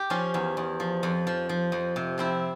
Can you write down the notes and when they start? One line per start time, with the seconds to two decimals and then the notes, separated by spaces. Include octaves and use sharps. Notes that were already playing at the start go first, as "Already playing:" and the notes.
Already playing: G4
0.10 F3 C#4 F4
0.34 E2
0.57 E2
0.80 F3
1.03 F2
1.27 F3
1.49 F3
1.72 F2
1.96 C3
2.18 F3 C4 E4